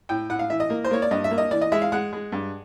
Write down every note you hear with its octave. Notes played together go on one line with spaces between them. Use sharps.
A2 G5
A2 F#5
F5
E3 E5
D#5
A#3
C5
A#3 C#5
D5
G2 D#5
E5
A#3
D#5
E3 D5
D#5
G#3 E5
F5
G#3 F#5
G#3
G2